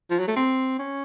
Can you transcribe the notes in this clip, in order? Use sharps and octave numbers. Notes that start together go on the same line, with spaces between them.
F3
F#3
A3
C4
C#4